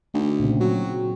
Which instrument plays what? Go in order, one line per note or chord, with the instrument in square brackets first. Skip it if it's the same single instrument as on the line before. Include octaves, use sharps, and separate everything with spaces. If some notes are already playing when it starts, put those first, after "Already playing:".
[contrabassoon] D2 [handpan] D#4
[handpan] A#2 C#3 C4
[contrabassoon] F#3